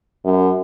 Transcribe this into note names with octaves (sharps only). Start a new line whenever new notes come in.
F#2